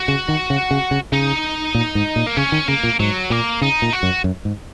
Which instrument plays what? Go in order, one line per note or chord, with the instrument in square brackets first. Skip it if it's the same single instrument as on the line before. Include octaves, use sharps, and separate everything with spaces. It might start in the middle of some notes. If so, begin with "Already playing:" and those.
Already playing: [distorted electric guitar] F#4
[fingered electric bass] C#3
D#3
C#3
C#3
C#3
[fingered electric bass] C#3 [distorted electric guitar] D#4
[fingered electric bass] A#2
G#2
A#2
[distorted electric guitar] A#3
[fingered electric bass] C#3 [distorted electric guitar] C#4
[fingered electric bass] D#3
[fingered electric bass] C#3 [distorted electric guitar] A#3
[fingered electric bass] A#2
[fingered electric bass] G#2 [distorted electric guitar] F#3
[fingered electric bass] A#2 [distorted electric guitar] A#3
[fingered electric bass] C#3 [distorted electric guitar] D#4
[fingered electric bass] A#2
[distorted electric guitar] F#4
[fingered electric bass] F#2
F#2
G#2